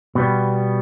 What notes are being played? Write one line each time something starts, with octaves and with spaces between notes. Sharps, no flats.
B2 G3 B3